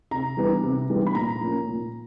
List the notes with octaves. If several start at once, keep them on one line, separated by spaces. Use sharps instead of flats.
C3 A#5
E3 G3 B3 D4
C3
E3 G3 B3 D4
B5
A#2 A#5
F3 A#3 C#4
A#2